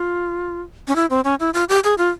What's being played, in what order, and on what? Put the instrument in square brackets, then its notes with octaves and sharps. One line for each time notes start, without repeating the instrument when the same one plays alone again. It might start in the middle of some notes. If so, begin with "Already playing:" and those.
Already playing: [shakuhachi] F4
C#4
E4
C4
C#4
E4
F4
G4
G#4
F4